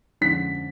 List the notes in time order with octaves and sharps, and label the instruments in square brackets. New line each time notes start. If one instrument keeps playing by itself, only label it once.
[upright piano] F2 D3 F3 G#3 C#4 B6